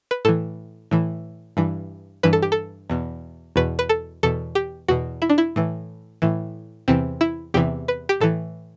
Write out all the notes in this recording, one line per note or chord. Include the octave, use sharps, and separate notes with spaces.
B4
A2 E3 A4
A2 E3
G2 E3
G2 E3 B4
A4
G4
A4
E2 B2
E2 B2 B4
B4
A4
E2 B2 A4
G4
E2 B2 F#4
E4
D4
E4
A2 E3
A2 E3
E2 C3 E3 C4
E4
E2 C3 E3 G4
B4
G4
A2 E3 A4